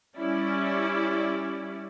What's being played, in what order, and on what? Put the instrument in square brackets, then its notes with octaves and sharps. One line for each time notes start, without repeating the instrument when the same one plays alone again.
[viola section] G3 C#4 E4 D5